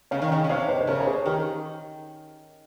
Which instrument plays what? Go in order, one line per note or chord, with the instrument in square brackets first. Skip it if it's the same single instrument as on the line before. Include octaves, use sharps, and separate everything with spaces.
[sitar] C#3 [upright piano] C#5 F5
[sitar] D#3
[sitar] C#3 [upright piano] D#5 G5
[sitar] C#3
[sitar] C3 [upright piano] C#5 F5
[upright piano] C5 D#5
C5
[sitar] C#3 [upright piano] A#4 C#5
[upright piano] C#5
G#4 C5
[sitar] D#3 [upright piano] G4 A#4